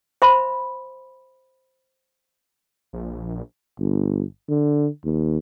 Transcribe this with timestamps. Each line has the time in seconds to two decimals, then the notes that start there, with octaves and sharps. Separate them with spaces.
0.22 C5 E5 B5 C6
2.93 A#1
3.79 G1
4.49 D3
5.04 D#2